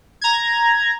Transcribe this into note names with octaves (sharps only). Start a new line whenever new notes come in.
A#5 G#6